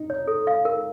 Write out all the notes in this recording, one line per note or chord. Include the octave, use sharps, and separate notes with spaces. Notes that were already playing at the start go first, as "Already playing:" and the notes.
Already playing: D#4
C#5
A4
F5
A#4